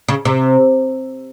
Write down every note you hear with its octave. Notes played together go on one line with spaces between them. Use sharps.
C#3
C3